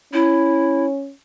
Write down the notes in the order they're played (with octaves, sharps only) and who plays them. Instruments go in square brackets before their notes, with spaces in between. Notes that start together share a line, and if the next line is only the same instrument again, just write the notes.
[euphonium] C#4 [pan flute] E4